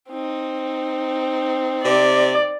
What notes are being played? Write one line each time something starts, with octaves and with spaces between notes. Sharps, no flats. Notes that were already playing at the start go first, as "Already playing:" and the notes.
C4 D#4
C3 D5